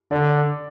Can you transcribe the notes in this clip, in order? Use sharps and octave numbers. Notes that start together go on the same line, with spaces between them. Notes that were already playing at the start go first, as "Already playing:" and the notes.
D3 D5